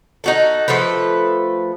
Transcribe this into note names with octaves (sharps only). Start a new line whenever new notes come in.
D#4 F#4 A4
F3 A3 A4 B4